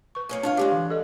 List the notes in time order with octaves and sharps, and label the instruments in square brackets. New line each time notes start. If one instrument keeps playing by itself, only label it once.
[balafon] B4 C#6
[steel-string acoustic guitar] A#3 C#4 G#4
[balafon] D4 [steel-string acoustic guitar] F4 C#5 F5
[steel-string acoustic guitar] D3 G#3 D4 [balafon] G4 F5
[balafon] E3
A4 D#5